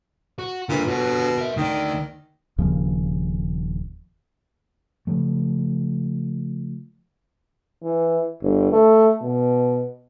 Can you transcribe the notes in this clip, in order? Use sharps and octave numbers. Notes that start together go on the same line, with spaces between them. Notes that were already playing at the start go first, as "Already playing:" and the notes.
F#4
A#2 D3 B4
B2 D3 B3
A#4 E5
D2 D#3 D5
D#1 D#2 C#3 F3
C#3 F3 A3
E3
G1
A3
B2